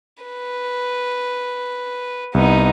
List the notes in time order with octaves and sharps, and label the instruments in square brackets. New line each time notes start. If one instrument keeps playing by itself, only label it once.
[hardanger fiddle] B4
[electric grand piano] C2 [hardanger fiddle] B3 D#4